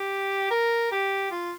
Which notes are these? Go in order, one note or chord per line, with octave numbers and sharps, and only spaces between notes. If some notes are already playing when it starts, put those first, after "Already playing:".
Already playing: G4
A#4
G4
F4